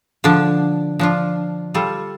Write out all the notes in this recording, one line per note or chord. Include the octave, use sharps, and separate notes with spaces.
D3 F3 D4
F3 D4 F4
G3 F4 A4